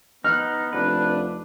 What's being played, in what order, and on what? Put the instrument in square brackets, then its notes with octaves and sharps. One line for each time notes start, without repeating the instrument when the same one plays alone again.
[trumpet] B3 [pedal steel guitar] D#4 [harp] F6 F#6
[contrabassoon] F1 [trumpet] D4 [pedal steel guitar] B4